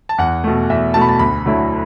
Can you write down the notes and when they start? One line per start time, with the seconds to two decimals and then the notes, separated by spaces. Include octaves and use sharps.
0.09 A5
0.18 E2 F#5
0.44 B2 A3
0.70 E2 E5
0.94 B2 A3 A5
1.01 B5
1.09 A5
1.19 D2 B5
1.46 D3 F#3 A3 E4